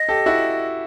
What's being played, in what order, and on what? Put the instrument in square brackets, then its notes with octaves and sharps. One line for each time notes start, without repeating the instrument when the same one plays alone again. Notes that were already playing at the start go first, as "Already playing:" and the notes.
Already playing: [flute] D#5
[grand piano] G4 A4
E4 F#4